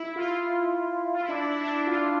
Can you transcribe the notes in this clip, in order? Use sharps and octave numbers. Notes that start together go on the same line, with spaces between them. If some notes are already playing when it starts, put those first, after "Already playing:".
Already playing: E4
F4
F4
E4
D4
E4
E4
D4
E4
F4